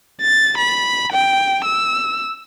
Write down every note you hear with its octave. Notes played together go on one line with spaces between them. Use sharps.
A6
B5
G5
E6